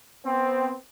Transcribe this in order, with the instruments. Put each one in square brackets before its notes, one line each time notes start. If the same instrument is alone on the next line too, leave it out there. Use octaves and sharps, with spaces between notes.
[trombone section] B3 C4